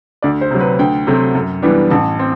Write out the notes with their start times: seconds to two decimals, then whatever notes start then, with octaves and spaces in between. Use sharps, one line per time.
0.23 D2 D5
0.41 C5
0.51 C3 F#3
0.60 B4
0.79 D2 G5
1.07 C3 F#3 A3 C4
1.35 F#2
1.62 E3 G3 B3 D4
1.90 A1 A5
2.19 C4